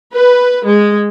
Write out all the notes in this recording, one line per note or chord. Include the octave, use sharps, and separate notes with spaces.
B4
G#3